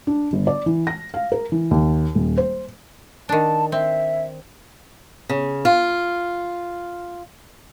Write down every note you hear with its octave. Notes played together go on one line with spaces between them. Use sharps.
D4
G1
D5
E3
A#6
F5
A#4
E3
D#2
D#1
C5
D#3 D4 A5
C4 E5
C#3
F4